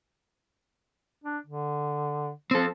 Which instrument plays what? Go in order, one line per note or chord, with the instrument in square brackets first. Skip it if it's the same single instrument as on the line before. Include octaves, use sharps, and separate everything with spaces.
[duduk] D4
D3
[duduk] F3 [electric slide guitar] C4 A4